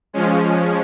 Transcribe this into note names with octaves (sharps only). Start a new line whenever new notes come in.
F3 G#3 C#4